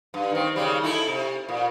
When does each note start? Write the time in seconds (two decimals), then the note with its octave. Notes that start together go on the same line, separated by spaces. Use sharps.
0.14 G2
0.31 D#3 C4
0.56 D#2 C#3 G3
0.83 D#4 E4 A4
1.07 C3
1.49 A#2